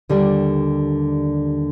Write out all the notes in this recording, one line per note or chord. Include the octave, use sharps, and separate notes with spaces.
D#2 D3 G3 D4